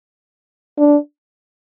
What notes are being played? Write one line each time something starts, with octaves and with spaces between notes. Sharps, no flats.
D4